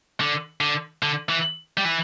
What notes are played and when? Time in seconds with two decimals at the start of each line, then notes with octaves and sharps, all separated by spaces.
0.20 D3
0.61 D3
1.03 D3
1.29 E3
1.77 G3
1.85 E3